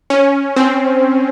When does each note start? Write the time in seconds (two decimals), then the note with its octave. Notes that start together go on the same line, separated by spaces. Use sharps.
0.10 C#4
0.56 C4